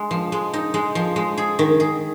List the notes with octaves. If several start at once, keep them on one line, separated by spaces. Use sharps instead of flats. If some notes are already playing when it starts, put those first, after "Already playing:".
Already playing: G#3
F3
G#3
D#4
G#3
F3
G#3
G#4
D#3
G#4